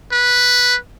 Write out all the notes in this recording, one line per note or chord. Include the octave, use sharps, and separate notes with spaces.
B4